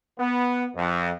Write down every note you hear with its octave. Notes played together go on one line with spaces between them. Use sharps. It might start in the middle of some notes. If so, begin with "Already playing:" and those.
B3
F2